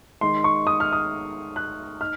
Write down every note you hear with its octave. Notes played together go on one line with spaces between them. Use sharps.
D#3 G#3 D#4 C6
C#6
D#6
F6
D#6
F#6
D#4 F6